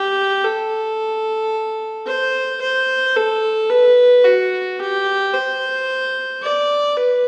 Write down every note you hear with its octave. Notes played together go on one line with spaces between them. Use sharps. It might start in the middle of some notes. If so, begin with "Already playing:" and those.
Already playing: G4
A4
C5
C5
A4
B4
F#4
G4
C5
D5
B4